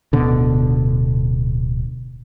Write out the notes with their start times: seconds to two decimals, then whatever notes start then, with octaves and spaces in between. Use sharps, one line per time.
0.13 D1 B2 D3